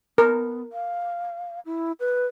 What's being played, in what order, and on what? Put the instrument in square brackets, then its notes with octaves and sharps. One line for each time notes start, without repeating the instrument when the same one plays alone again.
[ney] B3 [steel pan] A#4
[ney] F5
E4
B4